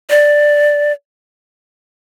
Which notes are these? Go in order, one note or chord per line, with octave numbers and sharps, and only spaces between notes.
D5